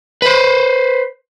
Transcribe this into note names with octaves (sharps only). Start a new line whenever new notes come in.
B4 C5